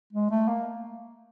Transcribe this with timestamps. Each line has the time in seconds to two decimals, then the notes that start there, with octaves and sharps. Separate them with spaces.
0.13 G#3
0.30 A3
0.48 A#3